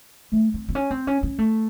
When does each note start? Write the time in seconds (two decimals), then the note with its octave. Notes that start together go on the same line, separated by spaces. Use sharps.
0.32 A3
0.54 C4
0.69 C4
0.75 C#4
0.91 C4
1.07 C#4
1.23 C#4
1.39 A3